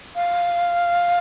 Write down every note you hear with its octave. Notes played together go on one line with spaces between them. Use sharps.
F5